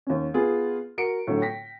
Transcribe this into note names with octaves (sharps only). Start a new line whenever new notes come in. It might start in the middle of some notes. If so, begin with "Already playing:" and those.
D#2 C#4
B3 F4 G#4
F#4 A#4 C#7 D7
A2 D3 F#3
G5 A#6 B6